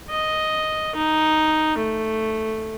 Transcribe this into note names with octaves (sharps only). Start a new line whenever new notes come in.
D#5
D#4
A3